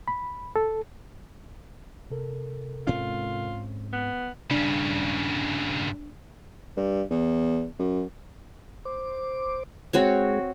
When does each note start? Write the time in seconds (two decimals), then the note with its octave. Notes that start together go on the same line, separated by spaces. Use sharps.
0.08 B5
0.56 A4
2.11 C3 A4 A#4
2.87 G#2 C4 C#4 F4
3.93 B3
4.51 G2 C#3 D4
6.77 G2
7.11 E2
7.80 F#2
8.85 C5 D6
9.93 G#3 C4 F#4 G#4 C#5